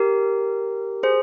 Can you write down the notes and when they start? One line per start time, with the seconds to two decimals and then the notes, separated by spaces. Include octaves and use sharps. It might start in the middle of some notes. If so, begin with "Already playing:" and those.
Already playing: G4 A#4
1.03 G#4 C5